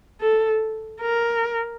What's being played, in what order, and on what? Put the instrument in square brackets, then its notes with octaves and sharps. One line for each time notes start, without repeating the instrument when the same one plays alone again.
[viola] A4
A#4